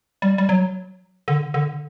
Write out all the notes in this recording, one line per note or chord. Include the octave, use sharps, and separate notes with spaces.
G3
G3
F#3
D3
D3